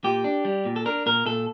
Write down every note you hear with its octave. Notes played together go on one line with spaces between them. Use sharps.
A#2 G4
D4
G3
A#2
A4
D4 A#4
A#2 A#4
A#2 A4